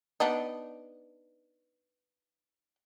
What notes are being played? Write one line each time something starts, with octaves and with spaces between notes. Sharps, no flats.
B3 D4 D#4